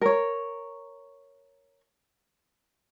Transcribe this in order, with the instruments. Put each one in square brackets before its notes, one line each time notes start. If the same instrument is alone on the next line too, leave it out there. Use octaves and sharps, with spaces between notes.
[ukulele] A#4 C#5